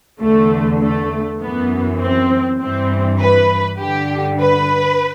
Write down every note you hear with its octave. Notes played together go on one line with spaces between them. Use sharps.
E2 D3 A3
A3
F#2 E3 B3
C4
G2 E3 C4
B4
G2 D3 G4
B4